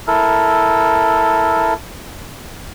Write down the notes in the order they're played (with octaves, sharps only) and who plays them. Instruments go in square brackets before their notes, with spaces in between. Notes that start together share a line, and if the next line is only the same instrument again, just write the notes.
[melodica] E4 A4 A#4